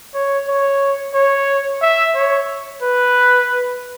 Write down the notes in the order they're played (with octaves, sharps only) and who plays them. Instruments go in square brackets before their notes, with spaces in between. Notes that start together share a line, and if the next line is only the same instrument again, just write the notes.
[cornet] C#5
C#5
C#5
E5
C#5
B4